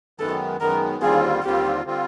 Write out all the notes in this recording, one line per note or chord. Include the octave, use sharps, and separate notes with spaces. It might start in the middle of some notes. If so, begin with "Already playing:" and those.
F#2 D#3 G#3 B3 A4
F#2 D#3 G#3 B3 A#4
D#2 D3 G3 C4 F4 G#4
D#2 D3 G3 C4 F4 G4
D3 G3 C4 F4